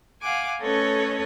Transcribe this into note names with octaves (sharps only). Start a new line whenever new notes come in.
F5 F#5 G#5 D6
A3 C#4 A4 B4 C#5 D#5